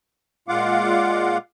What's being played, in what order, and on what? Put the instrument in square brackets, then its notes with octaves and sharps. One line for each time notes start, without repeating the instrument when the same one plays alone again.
[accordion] A#2 G#3 F4 F5 F#5 D6